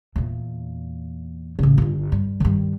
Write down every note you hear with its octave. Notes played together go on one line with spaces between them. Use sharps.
E2 A#2
A1 C#3
G1 F4
G2
G2 D#3